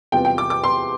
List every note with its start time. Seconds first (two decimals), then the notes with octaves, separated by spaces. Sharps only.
0.12 E2 C3 G3 B3 F4 G5
0.25 G5
0.38 D6
0.50 D6
0.64 C6